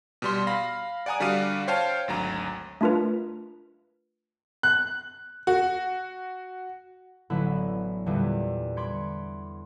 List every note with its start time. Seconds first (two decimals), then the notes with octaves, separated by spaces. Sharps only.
0.22 B2 G3 C6
0.47 F5 B5 A#6
1.06 D5 F#5 G#5 A#5 D#6
1.20 D3 G3 F#4 D5 F5 D#7
1.68 C5 C#5 F5 G5 A5
2.08 G#1 D2 F#3 A#5
2.81 A3 D4 F4 A#4 B4
4.63 F#6
5.47 F#4
7.30 A1 D3 F#3 B3 E4 B5
8.06 E2 A#2 D3 E3 G3
8.77 B5 C6 D6 G#6 B6 C#7